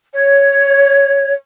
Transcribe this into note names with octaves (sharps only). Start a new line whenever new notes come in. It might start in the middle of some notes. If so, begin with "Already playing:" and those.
C#5